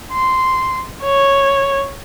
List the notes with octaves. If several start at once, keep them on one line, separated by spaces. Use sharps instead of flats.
C6
C#5